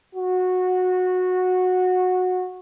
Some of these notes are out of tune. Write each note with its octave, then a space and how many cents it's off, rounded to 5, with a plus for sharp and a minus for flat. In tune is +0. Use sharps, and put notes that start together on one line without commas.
F#4 -15